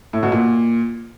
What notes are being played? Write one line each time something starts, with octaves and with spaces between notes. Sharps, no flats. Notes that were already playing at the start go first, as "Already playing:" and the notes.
A2
B2
A#2